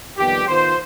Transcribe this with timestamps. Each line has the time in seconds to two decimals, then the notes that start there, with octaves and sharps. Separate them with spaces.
0.18 F2 D#3 G3 B3 G4
0.47 D#3 B3 F4 C5